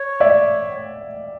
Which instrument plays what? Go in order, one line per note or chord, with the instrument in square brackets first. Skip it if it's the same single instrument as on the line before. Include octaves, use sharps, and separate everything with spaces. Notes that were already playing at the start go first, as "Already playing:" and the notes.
Already playing: [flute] C#5
[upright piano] D5 E5